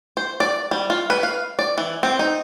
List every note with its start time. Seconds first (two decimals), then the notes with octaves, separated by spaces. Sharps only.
0.17 C5
0.40 D5
0.71 G3
0.90 F4
1.10 B4
1.23 F5
1.59 D5
1.78 E3
2.03 C4
2.19 D#4